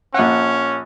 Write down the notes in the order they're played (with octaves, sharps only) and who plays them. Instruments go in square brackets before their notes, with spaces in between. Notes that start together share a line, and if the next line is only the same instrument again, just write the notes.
[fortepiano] A#1 F#5 [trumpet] C#4